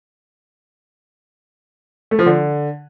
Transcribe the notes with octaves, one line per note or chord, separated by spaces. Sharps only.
A3
F3
D3